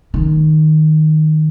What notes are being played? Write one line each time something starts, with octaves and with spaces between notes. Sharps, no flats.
D#3